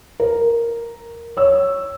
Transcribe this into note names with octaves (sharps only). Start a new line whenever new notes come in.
A#4
C#5 E6